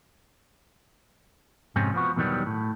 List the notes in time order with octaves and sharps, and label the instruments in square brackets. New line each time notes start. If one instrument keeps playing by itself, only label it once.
[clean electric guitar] F2 G#2 C3 C4 C#4
F3 B3 F#4
E2 B2 D#3 F#3 G3 B3
A2